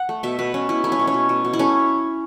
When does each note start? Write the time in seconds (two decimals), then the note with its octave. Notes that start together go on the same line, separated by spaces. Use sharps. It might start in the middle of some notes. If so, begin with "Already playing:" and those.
Already playing: F#5
0.09 A3
0.23 B2 E5
0.39 B2 B4
0.54 B2 C#4
0.69 B2 E4
0.84 A3 E4
0.92 C#4
0.99 B2
1.07 C#4
1.14 B2
1.29 B2
1.45 B2
1.53 E4
1.59 A3 C#4